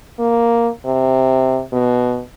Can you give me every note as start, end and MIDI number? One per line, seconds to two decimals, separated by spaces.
0.19 0.68 58
0.86 1.61 48
1.72 2.21 47